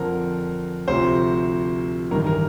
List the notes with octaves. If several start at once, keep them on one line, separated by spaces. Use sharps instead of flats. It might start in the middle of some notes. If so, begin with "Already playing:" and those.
Already playing: F2 D3 F3 A#4
D2 C3 F3 C5
A1 G2 D#3 A#4
A#4